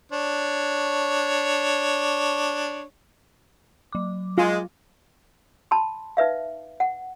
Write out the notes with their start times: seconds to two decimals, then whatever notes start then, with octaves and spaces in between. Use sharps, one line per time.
0.12 D4 C#5
3.93 F#3 D6
4.38 G#3 F4
5.71 A5 B5 C6
6.17 D#4 B4 E5 F5
6.80 F#5